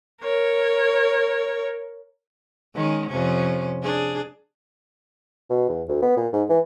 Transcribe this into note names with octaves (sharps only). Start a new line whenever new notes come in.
A#4 C#5
D#3 G#3 C#4
F2 C3 C#4
D4 G#4
B2
E2
D2
B3
A#2
G#2
E3